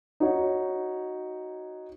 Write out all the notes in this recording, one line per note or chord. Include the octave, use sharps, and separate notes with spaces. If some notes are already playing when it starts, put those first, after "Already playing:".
D#4 F#4 C#5